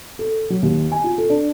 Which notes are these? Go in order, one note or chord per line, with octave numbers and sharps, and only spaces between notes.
A4
F#3
D#2
G#5
F4
A4
D4